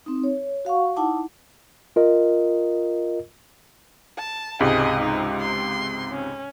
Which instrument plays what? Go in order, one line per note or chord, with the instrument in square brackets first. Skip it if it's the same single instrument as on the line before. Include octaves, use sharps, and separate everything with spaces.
[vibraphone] C4 D#4
C#5
F#4 F5 F#5 C#6
D#4 E4 F#5 A5 D6
[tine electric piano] F4 A#4 D#5
[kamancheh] A5
[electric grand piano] C#2 G#2 C3 [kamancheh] G#4 D#5
[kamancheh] D#4
C6
C#4